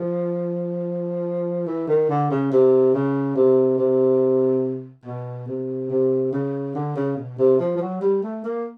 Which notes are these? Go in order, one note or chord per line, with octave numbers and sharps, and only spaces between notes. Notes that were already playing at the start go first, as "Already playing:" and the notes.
Already playing: F3
E3
D#3
D3
C#3
C3
C#3
C3
C3
B2
C3
C3
C#3
D3
C#3
B2
C3
F3
F3
F#3
G3
A3
A#3